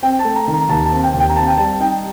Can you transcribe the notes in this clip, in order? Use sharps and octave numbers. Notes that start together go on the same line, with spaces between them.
C4 G5
A5
A3
A#5
D#3
A#5
D#2 A5
A5
C4
G5
D#2
G5
A#5
C4 A5
G5
G3 A5
D#4 G5